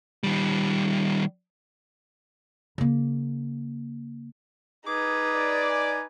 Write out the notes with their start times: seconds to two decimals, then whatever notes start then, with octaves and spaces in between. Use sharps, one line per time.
0.23 D#3 G3
2.78 C#3 A#3
4.87 D#4 G#4 B4 D6
5.35 D5
5.70 G#5